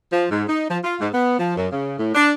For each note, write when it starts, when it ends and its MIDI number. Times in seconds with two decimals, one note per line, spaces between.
0.12 0.26 53
0.31 0.44 44
0.48 0.67 63
0.70 0.78 53
0.84 0.96 65
1.01 1.09 44
1.14 1.37 59
1.39 1.54 53
1.57 1.67 42
1.71 1.97 49
1.99 2.15 45
2.15 2.32 62